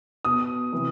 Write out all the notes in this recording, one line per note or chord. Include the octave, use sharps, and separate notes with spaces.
B2 D#6
C3 E3